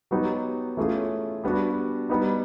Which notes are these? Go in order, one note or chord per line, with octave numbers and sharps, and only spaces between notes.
F#3 B3 D#4 G4
E3 A3 C#4 F4 G#4
G3 B3 D4 F#4
G3 B3 D#4